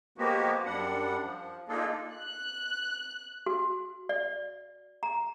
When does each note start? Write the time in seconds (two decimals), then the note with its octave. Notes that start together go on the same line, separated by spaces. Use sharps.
0.18 F3 G#3 A#3 B3 F#4 G4
0.66 F#2 G3 D4 F#5
1.23 F3
1.68 A#3 D4 D#4 F4 G#4 A4
2.14 F#6
3.46 F#4
4.09 D5
5.03 A#5